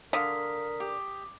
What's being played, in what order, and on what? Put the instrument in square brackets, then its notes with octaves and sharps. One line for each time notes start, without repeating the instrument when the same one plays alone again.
[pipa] D3 [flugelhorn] A#4 [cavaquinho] F5 C6 [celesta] D#6 B6
[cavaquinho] G4